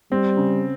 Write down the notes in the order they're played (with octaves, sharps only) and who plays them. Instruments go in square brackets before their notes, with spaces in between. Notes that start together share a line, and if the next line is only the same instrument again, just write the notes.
[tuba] G3 [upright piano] C4
[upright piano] C#3